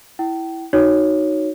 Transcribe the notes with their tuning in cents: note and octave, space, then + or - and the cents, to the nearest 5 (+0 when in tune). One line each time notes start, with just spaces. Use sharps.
E4 +0 G5 -35
D#4 +0 F#4 +0 C#5 +0